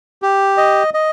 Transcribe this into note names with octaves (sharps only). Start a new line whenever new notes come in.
G4
D#5
D#5